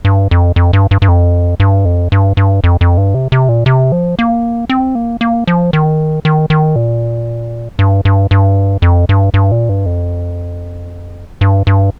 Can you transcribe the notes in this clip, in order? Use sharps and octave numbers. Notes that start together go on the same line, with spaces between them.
G2
F2
F2
G2
G2
G2
F2
G2
F2
G2
G2
F2
F2
G2
C3
C3
A#2
C3
F3
A#3
C4
A#3
A#3
F3
D#3
D#3
D#3
A#2
G2
G2
G2
F2
G2
G2
A#2
G2
F2
G2
G2